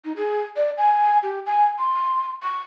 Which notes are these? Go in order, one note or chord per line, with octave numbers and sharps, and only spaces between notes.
D#4
G#4
D5
G#5
G4
G#5
C6
C#6